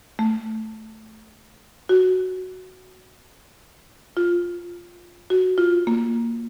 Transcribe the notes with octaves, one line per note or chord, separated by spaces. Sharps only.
A3
F#4
F4
F#4
F4
A#3